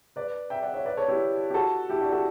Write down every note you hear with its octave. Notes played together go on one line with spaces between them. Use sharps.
B4 D5
E5 G5
D5 F#5
C#5 E5
B4 D5
A4 C#5
E4 G4
G4
F#4 A4
E4 G4
D4 F#4
F#4 A4